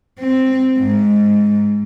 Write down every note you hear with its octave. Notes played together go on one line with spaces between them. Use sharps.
C4
G#2